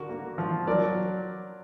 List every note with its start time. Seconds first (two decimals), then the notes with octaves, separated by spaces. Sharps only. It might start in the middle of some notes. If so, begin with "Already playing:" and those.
Already playing: D3 F#4 A#4
0.09 A#3
0.38 F3
0.67 F#3 A#4 D5